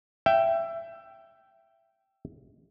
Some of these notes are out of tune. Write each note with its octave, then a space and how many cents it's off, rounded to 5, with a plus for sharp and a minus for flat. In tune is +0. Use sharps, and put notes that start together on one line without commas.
E5 +20 G5 -10